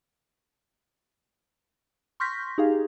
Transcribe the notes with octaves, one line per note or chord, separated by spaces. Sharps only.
C6 C#6 F6 G6 A#6 B6
D#4 G4 G#4 F5